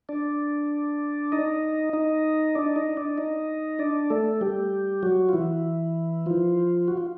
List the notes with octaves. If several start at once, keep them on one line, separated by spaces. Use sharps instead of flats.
D4 D5
D#4 D#5
D#4 D#5
D4 D5
D#4 D#5
D4 D5
D#4 D#5
D4 D5
A3 A4
G3 G4
F#3 F#4
F4
E3 E4
F3 F4
F#4
F4